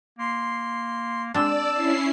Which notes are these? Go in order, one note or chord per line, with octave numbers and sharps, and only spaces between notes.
A#3 C6
G#3 C4 D4 D5 A5 E6
C#4 E4 C7